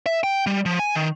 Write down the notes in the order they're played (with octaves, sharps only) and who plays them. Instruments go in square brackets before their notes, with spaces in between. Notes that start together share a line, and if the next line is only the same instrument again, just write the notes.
[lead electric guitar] E5
G5
G3
F3
G#5
D#3